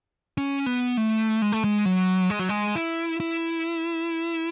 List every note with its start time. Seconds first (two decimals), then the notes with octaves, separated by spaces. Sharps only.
0.38 C#4
0.66 B3
0.97 A3
1.42 G#3
1.52 A3
1.64 G#3
1.85 F#3
2.30 G#3
2.39 F#3
2.49 G#3
2.76 E4
3.20 E4